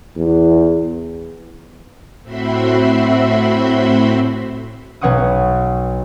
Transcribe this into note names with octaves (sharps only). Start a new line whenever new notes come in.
E2
A2 C4 F#4 E5 B5 C6
B1 C#5 F#5 C#6 D#6